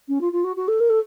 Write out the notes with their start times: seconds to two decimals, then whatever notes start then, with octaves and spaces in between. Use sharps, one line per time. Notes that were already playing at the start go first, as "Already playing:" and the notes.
0.08 C#4
0.21 F4
0.32 F4
0.44 F#4
0.56 F#4
0.68 A4
0.80 A#4
0.90 A4